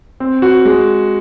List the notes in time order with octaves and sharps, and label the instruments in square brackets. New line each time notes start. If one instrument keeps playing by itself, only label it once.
[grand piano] C4
F#4
G#3